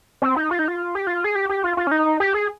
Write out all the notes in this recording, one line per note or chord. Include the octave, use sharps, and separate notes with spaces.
C4
D#4
F4
D#4
F4
G4
F4
G#4
G4
G4
F4
F4
C#4
D#4
G4
G#4